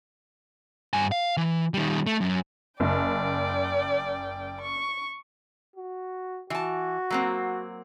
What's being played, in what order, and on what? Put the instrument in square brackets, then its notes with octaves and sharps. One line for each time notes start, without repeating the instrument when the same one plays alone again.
[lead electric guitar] G2 G#5
F5
E3
D#3 G3
A3
F#2
[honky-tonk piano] F#1 [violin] D5 G5
[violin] C#6
[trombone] F#4
[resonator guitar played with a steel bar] E3 A5 [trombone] F#4
[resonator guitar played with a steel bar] F#3 A#3 C4